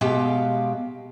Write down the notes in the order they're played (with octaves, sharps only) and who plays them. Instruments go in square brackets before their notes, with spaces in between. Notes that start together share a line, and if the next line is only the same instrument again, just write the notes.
[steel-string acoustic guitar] B2 G#3 G4 F5 G5